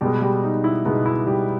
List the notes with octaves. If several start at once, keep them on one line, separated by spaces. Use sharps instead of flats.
B2 G3 G#3 B3 G4
G3 G4
D#4
E4
B2 G#3 B3 D#4
E4
G3 G4